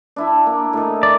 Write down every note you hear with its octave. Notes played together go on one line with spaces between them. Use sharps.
D4 E4 G#5
A#3
A2 D#3
D5